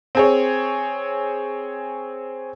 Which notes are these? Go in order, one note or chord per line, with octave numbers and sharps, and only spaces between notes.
C4 G#4 C#5